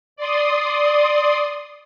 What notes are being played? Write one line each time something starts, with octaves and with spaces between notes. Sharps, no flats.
D5 C6 D#6